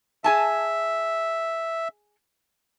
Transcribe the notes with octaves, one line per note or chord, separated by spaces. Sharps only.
G#4 E5 G#5 A5